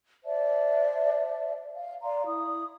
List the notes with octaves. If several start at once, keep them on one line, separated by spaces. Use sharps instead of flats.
C5 D5 E5 A5
F5
D5 F5 A#5 C6
E4 D#6